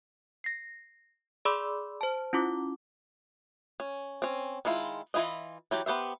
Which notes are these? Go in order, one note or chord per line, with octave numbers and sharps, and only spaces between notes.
A#6 C7
G#4 D5 B5 C6 D6 E6
C5 A5
C#4 E4 F4 D6
C#4
C4 C#4
D#3 G#3 E4 F4
E3 F3 E4 F4 D#5
E3 F#3 G4
B3 G4 C5 E5